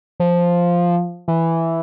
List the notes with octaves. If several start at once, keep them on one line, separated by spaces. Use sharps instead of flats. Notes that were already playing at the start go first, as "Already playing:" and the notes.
F3
E3